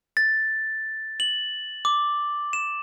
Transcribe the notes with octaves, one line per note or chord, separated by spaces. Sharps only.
A6
F#7
D6
E7